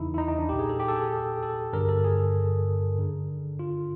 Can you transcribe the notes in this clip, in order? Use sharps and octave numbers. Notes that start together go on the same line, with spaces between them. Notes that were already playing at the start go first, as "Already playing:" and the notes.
Already playing: E2 C#3 E3 D#4 E4
E4
D#4
D#4
D4
C2 A#2 G4
G#4
A4
G4
A4
G#4
A4
G2 D3 A#4
A4
G#4
F#2 D3
F4